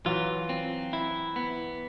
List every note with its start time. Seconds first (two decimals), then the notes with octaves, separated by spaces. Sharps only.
0.06 E3 F#3 F4
0.49 C4
0.93 E4
1.36 B3